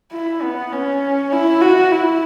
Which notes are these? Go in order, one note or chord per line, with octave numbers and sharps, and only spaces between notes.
E4
B3
C#4
E4
F#4
E4